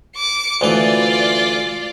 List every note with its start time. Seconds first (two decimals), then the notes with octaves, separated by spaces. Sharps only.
0.16 D6 C#7
0.61 D2 E3 F4 B4 D5